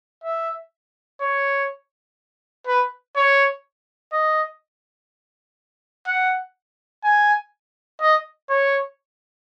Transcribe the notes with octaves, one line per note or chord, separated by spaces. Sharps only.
E5
C#5
B4
C#5
D#5
F#5
G#5
D#5
C#5